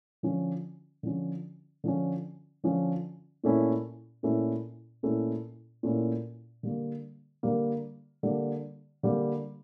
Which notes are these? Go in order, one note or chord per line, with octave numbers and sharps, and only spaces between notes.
D3 F3 C#4
D3 F3 C#4
D3 F3 C#4
D3 F3 C#4
A#2 A3 C#4 E4
A#2 A3 C#4 E4
A#2 A3 C#4 E4
A#2 A3 C#4 E4
D3 G3 A#3
D3 G3 A#3
D3 G3 A#3
D3 G3 A#3